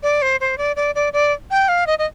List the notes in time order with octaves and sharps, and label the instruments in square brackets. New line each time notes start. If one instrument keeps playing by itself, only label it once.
[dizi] D5
C5
C5
D5
D5
D5
D5
G5
F5
D#5
D#5